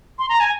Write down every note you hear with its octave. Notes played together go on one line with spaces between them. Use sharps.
C6
A#5
G#5